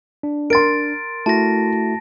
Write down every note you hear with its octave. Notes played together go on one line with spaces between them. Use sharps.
D4
A#4 C6 A6 D7
A3 E4 F#4 A5 A#6